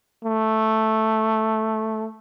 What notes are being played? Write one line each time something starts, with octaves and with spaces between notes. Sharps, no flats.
A3